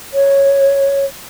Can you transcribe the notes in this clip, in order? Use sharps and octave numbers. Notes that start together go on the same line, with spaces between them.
C#5